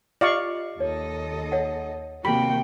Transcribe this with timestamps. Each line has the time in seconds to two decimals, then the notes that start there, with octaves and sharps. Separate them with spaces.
0.21 F4 G4 D5 D#5 F5 C#6
0.80 D#2 A4 C#5 D#5
1.52 C#5 F#5
2.25 C3 D#3 A#3 F#4 G4 G5 B5